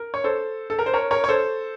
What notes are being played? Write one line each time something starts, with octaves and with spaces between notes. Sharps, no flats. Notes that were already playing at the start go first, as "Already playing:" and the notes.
Already playing: A#4
C#5
A4 C5
A4
A#4
C5
A#4 C#5
A#4 C#5
C#5
A4 C5